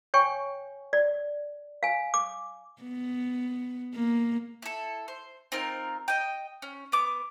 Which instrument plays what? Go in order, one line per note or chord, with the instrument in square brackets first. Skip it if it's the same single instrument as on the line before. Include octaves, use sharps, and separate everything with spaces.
[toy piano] C#5 G5 G#5 C#6
D5
F5 G#5
D6
[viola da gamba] B3
A#3
[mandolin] E4 A4
C5
C4 D#4 F4 A#4
D#5 G5
C#4
B3 D6